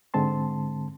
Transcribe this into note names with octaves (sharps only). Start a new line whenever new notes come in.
G#2 D3 G#3 C4 A5 C6